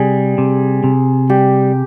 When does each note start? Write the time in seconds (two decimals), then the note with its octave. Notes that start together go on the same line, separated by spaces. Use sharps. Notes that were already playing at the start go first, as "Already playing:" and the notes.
Already playing: C3 G3 G#4
0.38 C3
0.84 C3
1.30 G3 G4